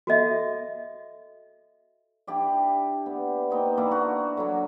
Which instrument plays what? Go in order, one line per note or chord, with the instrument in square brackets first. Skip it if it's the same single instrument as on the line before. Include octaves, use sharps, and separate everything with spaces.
[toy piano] F#4 A4 D#5 E5
[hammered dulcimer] D4 E4 G4 D5
B3
A#3 D#4 C5 G5
A#3 D4 E4 D5
F#4 A#4
D3 F#3 E4